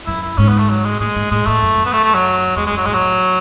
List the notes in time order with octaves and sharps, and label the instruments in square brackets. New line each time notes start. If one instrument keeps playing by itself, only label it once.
[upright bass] F#2 [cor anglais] E4
[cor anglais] E4
[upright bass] G#2 [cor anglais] C#4
[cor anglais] B3
A3
F#3
G#3
[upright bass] A2 [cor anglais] G#3
[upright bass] G#2
[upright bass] A2 [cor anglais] G#3
[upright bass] A2 [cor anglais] A3
[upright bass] F#2
F#2
[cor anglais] B3
A3
A3
F#3
[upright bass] E2 [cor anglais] G#3
[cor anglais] G#3
[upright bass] F#2
[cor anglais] F#3
[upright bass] A2 [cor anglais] G#3
[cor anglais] F#3